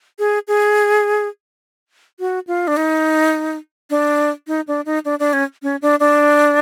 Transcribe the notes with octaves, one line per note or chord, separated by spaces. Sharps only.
G#4
G#4
F#4
F4
D4
D#4
D4
D#4
D4
D#4
D4
D4
C#4
C#4
D4
D4